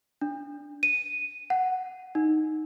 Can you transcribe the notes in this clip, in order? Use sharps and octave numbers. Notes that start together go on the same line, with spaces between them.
D4
D#7
F#5
D#4